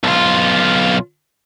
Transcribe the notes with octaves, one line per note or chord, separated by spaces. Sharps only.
B1 F4